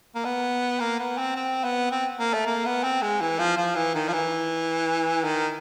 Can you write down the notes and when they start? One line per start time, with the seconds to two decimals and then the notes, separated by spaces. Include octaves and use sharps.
0.15 A#3
0.25 B3
0.80 A#3
0.99 B3
1.18 C4
1.36 C4
1.64 B3
1.91 C4
2.19 A#3
2.33 A3
2.46 A#3
2.65 B3
2.84 C4
3.02 G#3
3.21 E3
3.39 F3
3.57 F3
3.75 E3
3.94 D#3
4.08 F3
4.13 E3
5.24 D#3